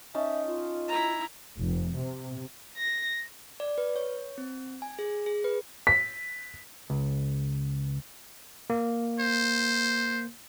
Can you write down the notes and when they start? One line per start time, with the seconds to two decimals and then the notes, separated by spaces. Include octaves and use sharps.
0.14 C#4 D#4 E5 A5
0.46 F4
0.88 E4 A#5
1.58 F1
1.97 C3
2.76 A#6
3.60 D5
3.78 B4
3.96 C#5
4.38 C4
4.82 G#5
4.99 G#4
5.26 G#4
5.44 B4
5.87 B6
6.90 C#2
8.70 A#3
9.20 C5